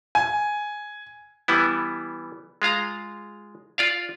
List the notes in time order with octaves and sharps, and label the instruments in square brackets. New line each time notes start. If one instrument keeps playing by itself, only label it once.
[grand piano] G#5
[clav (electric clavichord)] E3 G3 B3 E4
G#3 F4 F5 A#5
F4 D5 F5